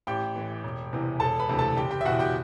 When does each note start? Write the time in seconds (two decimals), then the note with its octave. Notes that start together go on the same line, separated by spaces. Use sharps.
0.07 A1 G4 G5
0.36 A2 E3
0.63 E1
0.93 E2 C3 E3
1.20 E1 A4 A5
1.39 B4 B5
1.48 D2 C3 E3
1.59 A4 A5
1.77 F#1 G4 G5
1.91 G4 G5
2.01 E5
2.05 E2 B2 F#4 F#5
2.19 G4 G5